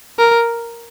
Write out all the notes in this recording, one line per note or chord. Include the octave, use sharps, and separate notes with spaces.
A#4